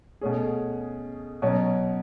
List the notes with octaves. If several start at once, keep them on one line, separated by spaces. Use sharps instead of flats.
B2 A3 C#4 G#4
B2 F#3 C#4